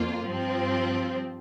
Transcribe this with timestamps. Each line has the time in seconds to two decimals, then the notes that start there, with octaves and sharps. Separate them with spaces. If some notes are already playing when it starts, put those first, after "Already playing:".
Already playing: F2 A#3 F4
0.25 G2 F3 C4